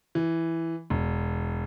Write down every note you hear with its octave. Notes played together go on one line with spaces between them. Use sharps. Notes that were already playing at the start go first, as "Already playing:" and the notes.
E3
E1